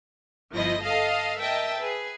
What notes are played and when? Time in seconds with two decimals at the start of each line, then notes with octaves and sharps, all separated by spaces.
0.53 G1 F3 E4 D#5 A#6
0.83 A4 D#5 F5 A5
1.41 A#4 D#5 E5 G5 A5
1.78 G#4 B4